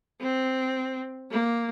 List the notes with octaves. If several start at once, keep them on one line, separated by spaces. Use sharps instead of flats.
C4
A#3